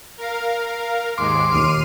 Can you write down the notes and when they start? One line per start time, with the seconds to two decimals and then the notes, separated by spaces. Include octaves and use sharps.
0.17 A#4 F5
1.18 D#2 G#2 G#3 C6 D6
1.50 D#2 A#2 F6 C7 D#7